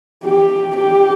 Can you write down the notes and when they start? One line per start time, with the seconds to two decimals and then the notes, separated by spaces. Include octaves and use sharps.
0.24 G4
0.76 G4